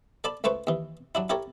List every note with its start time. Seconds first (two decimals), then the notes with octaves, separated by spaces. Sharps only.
0.24 A4 D5 A5 B5
0.44 C#2 A3 B4 C5 C#6
0.67 D#2 E3
1.15 F#3 D4 E4
1.30 E4 G4 A4 A#4 C#5